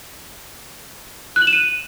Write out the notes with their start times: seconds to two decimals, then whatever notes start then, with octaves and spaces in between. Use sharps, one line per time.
1.36 F#6
1.42 F#7
1.47 E7
1.53 D#7